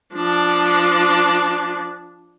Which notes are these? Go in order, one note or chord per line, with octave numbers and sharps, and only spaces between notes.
F3 D4